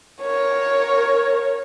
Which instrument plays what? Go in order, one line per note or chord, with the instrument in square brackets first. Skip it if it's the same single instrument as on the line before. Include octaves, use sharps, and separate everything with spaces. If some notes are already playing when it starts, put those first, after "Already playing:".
[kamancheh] A#4 C#5